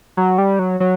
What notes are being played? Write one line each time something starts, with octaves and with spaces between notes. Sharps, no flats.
F#3
G3
F#3
F#3